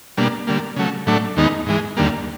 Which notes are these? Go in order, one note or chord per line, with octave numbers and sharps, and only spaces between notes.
B2 G3 A#3 D4
D3 G3 A#3
C#3 F#3 A3
A2 F#3 A3 D4
D#2 D#3 G#3 B3 D#4
G#2 E3 G#3
D#2 D3 G3 A#3